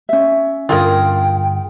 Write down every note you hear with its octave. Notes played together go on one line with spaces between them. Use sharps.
C#4 E5
G2 D3 F4 G#4 A#4 G5